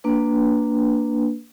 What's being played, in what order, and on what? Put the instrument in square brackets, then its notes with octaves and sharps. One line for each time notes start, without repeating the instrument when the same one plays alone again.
[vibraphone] A#3 D4 B4